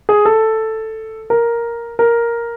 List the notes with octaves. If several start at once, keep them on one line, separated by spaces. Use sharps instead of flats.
G#4
A4
A#4
A#4